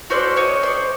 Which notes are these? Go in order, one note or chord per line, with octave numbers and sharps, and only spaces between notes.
C#4 F#4 A4 C5 D5
C#5 D#5
C5 D5